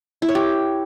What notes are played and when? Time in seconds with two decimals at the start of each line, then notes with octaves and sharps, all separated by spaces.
0.22 E4
0.29 C#5
0.35 G4